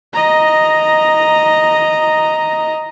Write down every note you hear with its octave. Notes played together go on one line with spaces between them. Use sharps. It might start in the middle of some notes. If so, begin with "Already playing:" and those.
D#5 A#5